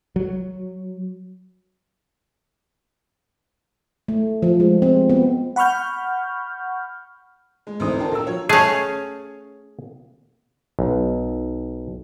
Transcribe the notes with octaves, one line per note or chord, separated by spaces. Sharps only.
F#3
A3
F3
G#3
C4
B3
F#5 B5 C#6 F6 G6
G#3
G#1 D2 E3 D#4 C5 D#6
D4 A4 A#4 C5 G5 A5
A#1 A#3 A#5 E6
F3 F#4 C#5
A3 C#4 G#4
B1